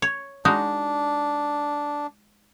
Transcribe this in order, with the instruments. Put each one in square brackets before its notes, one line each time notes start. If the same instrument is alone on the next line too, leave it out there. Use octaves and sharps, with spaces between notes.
[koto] C#5
[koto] G#3 D#4 F#4 [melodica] D4